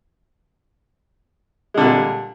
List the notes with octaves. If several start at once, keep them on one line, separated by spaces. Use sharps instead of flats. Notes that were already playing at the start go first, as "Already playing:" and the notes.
A#2 D3 G3 G#3